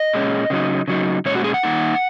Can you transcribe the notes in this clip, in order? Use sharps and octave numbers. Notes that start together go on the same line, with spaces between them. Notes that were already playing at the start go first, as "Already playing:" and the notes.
Already playing: D#5
A#2 G#3 C#4
C#3 F#3 D#4
C#3 F#3 D#4
A#2 G#3 C#4 C#5
F#4
G#4
F#5
D#3 A#3 D#4